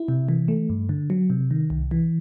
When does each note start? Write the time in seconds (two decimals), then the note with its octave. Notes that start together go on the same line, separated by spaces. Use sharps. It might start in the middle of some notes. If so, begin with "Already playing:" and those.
Already playing: E4
0.08 C3
0.29 E3
0.48 A3
0.70 G2
0.89 D3
1.10 F#3
1.30 C3
1.51 D#3
1.70 C2
1.91 E3